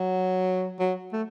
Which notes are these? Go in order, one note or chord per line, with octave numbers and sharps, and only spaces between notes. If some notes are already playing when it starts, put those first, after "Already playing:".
Already playing: F#3
F#3
A3